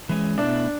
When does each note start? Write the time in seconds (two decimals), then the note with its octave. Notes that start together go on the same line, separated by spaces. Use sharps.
0.09 E3 G#3 C#4
0.38 B2 A3 D4 E4